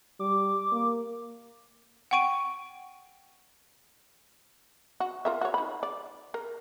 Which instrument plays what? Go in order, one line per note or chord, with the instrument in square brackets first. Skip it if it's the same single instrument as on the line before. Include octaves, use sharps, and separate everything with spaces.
[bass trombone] G3 [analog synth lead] D6
[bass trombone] A#3
[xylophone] F#5 G5 C#6 D7 D#7
[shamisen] F#4
F4 A#4 E5
F#4 C#5
D#4 B5
D5
A#4